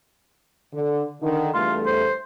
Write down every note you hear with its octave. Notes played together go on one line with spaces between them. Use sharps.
D3
D3 D#3
E2 G2 A3 F4
C5